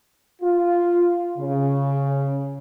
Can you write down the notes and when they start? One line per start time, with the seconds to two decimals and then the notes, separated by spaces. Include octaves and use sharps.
0.42 F4
1.38 C#3